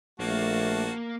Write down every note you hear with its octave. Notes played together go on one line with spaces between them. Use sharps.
A#1 A3 A#3 F#4 A5